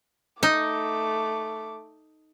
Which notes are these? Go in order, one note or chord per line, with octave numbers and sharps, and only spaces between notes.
A3 D#4 D6